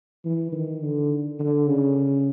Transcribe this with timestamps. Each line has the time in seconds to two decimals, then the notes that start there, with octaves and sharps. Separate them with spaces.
0.25 E3
0.52 D#3
0.82 D3
1.39 D3
1.68 C#3